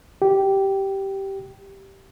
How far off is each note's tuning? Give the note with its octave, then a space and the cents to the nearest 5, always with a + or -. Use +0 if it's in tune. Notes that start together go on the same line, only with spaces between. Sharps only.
G4 -10